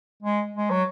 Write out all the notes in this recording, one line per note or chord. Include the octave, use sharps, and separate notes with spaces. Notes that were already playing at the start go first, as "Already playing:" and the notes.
G#3
G#3
F#3